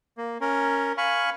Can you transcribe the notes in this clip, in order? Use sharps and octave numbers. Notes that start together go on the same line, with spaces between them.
A#3
C#4 A#4
F5 G#5 B5 C#6